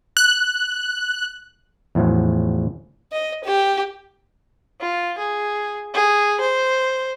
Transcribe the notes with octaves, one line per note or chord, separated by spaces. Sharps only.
F#6
E2 A2 F3 F#3
D#5
G4
F4
G#4
G#4
C5